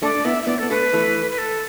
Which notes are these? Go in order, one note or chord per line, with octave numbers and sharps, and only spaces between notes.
A3 D4 D5
D4
B3 E4 E5
E5
B3 E4 D5
B3 A4
A3 D4 B4
E3 A3
B4
A4